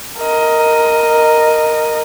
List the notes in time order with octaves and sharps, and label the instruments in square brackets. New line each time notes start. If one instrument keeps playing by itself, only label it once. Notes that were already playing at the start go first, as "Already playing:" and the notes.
[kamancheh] A#4 D#5